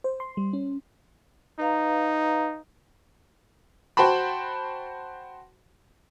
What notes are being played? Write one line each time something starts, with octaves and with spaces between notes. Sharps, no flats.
C5
C6
G3
C#4
D#4 B4 F5 A#5
F#4 C5 G5 A5 B5